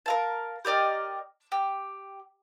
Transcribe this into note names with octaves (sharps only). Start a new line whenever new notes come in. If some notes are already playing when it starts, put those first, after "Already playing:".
A#4 F5 A5
G4 A#4 D5 D#5
G4